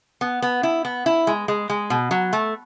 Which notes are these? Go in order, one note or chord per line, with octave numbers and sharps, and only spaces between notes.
B3
B3
E4
B3
E4
G#3
G#3
G#3
B2
F#3
A3